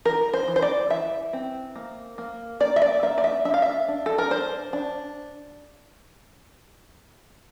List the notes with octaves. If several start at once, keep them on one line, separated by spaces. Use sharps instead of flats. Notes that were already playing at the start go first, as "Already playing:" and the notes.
E3 A#4
C5
E3
C5
D5
E3 E5
C4
A#3
A#3
A#3 D5
E5
D5
A#3 E5
D5
E5
D4 E5
F5
E5
D4
A4
A#4
D4 C5
D4